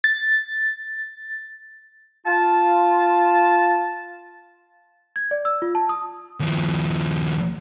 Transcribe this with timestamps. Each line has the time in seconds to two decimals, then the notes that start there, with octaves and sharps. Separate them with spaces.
0.04 A6
2.26 F4 A5
5.16 G#6
5.31 D5
5.45 E6
5.62 F4
5.75 A5
5.89 D#6
6.40 D#2 F3